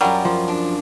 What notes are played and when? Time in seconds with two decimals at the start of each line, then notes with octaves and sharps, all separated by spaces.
0.01 F#2 F#3 G3 F4 A#4
0.25 F3
0.48 D4